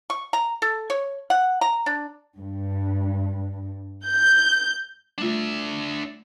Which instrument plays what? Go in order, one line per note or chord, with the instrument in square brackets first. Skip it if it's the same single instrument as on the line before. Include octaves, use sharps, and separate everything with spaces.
[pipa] C#6
A#5
A4
C#5
F#5
A#5
D4
[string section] G2
G6
[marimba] G3 A3 F4 [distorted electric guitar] D4 E5